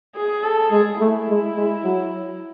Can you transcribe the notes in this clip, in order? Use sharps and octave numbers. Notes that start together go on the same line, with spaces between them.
G#4
A4
G#3 G#4
A3 E4
G#3
G#3
F#3